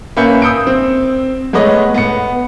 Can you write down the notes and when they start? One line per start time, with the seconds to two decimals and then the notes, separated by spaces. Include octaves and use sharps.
0.17 A#3 C#4 B4 E5 G6 C#7
0.42 D#6 E6 G6 C#7 D7
0.67 C4
1.53 G#3 A3 B3 B4 C#5 D#5
1.94 B3 C#7